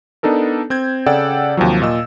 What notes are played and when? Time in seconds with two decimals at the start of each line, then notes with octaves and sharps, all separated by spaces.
0.23 B3 D4 D#4 A4 A#4
0.70 C4 G6 G#6
1.06 C#3 A4 D5 F#5 G5 E6
1.57 D#2 C3 F3 F#3
1.82 A#2 D#5 E6